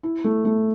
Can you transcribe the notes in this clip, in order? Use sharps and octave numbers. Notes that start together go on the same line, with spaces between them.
E4
A3
A3